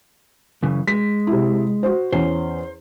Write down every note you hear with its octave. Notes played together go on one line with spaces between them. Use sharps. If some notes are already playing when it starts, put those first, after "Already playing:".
F#2 C#3 E3
G#3 B6
C3 E4
F#4 C5
E2 C#4 C5